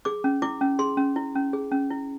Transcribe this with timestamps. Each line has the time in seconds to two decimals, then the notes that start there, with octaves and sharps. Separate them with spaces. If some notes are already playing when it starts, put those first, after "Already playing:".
0.05 G#4 D6
0.24 C#4
0.42 E4 D6
0.61 C#4
0.79 G#4 C6
0.97 C#4
1.16 E4
1.35 C#4
1.53 G#4
1.71 C#4
1.91 E4